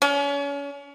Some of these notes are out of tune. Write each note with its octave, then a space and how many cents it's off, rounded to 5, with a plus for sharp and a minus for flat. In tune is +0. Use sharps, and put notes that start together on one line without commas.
C#4 +35